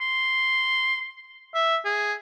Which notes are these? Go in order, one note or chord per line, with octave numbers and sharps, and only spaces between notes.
C6
E5
G#4